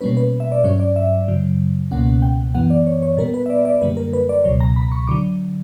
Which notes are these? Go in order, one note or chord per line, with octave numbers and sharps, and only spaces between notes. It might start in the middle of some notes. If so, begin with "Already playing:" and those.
B2 G3 A#3 C#4 B4
B4
E5
D5
G2 F#3 C#4 C#5
D5
E5
F#2 C#3 F#3
C#2 B2 A#3 C#4 F#5
G5
F#2 E3 B3 F#5
D5
C#5
C#5
A#2 G3 B3 A#4
B4
E5
D5
D5
F#2 D3 G3 A#3 B4
A#4
B4
D5
C#2 B2 F#3 C#5
A#5
B5
C#6
D3 F#3 D6